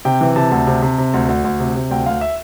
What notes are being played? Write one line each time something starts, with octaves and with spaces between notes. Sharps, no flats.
C3 G5
E3
C3 A5
D2
C3
C3
C3
D2
D2
D2
C3
C3
D2 G5
D2 F5
E5